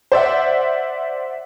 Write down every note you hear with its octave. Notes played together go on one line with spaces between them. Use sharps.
C5 D5 E5 F#5